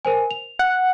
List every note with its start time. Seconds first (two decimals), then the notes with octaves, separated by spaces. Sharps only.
0.05 A#4 C5 G#5
0.31 F7
0.59 F#5